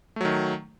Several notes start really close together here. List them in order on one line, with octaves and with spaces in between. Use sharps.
A3 F#3 D#3